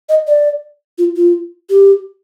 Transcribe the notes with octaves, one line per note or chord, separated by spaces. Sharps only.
D#5
D5
F4
F4
G4